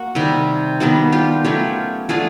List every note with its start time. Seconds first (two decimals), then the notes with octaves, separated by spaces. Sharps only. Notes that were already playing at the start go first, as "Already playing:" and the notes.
Already playing: A#3 F#4
0.15 C3 D#3 G3 C4
0.80 D#3 G3 B3 D4 F#4
1.12 F4 G4
1.44 F#3 A3 C#4 F4 G4
2.09 F3 A3 D4 F4 F#4 G#4